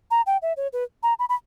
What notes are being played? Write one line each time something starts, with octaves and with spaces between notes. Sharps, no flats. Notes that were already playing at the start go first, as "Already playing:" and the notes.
A#5
G5
E5
C#5
B4
A#5
B5
B5